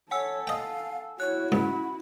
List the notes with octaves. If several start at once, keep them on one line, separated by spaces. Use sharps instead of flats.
A4 C#5 F#5 G#5 E6
D#5 F5 G5
E4 F#4 C#5 F#6
C#2 G#2 C#4 B5